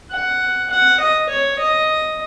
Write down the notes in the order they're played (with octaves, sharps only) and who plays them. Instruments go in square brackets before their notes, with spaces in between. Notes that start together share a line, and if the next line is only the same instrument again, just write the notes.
[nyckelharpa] F#5
F#5
D#5
C#5
D#5